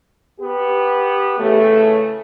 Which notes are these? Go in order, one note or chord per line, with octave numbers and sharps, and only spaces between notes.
B3 G4
C#3 E3 A3